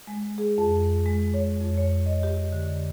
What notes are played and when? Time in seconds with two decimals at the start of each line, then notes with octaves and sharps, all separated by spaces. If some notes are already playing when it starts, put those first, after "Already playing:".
0.07 G#3
0.38 G#4
0.58 F2
1.06 G#3
1.34 C#5
1.61 F2
1.78 C#5
2.06 D#5
2.23 G4
2.52 D3